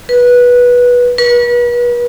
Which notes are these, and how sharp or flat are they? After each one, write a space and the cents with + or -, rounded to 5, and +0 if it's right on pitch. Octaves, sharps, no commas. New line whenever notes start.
B4 -15
B4 -40